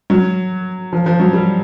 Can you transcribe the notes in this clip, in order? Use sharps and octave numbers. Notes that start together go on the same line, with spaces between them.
F#3
F3
F3
F#3
G3